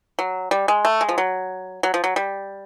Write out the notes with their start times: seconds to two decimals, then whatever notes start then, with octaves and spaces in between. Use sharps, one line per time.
0.19 F#3
0.51 G3
0.68 G#3
0.85 A3
1.01 G#3
1.09 F3
1.18 F#3
1.83 F#3
1.94 F3
2.04 F#3
2.16 G3